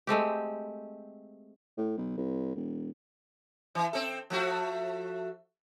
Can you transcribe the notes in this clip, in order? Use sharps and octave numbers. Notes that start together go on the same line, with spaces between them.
G#3 A3 C4 G4
A2
B1
C2
E1
E3
C4 A4
F3 A3 F#4